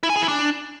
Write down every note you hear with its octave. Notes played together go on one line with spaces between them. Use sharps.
E4
G#5
G#4
E4
D4